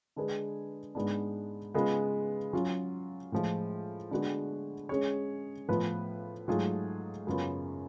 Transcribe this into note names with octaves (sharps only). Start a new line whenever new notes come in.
D3 G#3 D4 G#4 B4
G#2 G#3 B3 D4
C#3 G#3 B3 F4 B4
F#3 C#4 F4
A2 F3 G#3
D3 G#3 B3 F#4
G#3 C#4 G#4 C#5
A2 F3 B3 F4 B4
G#2 F#3 A3 F4 G#4
F#2 C#3 F#3 B3 F4